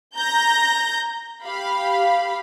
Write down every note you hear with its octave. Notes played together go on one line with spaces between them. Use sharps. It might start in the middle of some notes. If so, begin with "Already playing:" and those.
A#5 G6 A#6
G4 F5 B5